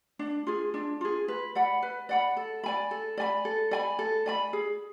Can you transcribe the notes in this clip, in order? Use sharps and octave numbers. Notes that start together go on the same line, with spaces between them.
D4
F4 G#4
D4
F4 G#4
B4
D5 F#5 B5
B4
D5 F#5 B5
A4
D5 G#5 B5
A4
D5 G#5 B5
A4
D5 G#5 B5
A4
D5 G#5 B5
G#4